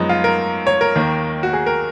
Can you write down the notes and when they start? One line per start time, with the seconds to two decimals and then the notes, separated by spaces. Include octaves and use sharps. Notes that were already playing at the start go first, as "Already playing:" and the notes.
Already playing: F#2 F3 G#3 B3 D#4
0.09 F4
0.24 A#4
0.67 C#5
0.81 A#4
0.96 D#2 D#3 A#3
1.43 F#4
1.53 G#4
1.66 A#4